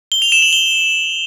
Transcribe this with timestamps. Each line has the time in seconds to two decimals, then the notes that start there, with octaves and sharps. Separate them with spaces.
0.12 G7
0.22 F7
0.32 E7
0.42 F#7
0.53 G7